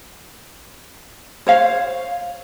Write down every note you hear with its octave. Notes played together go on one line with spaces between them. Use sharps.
C5 C#5 F5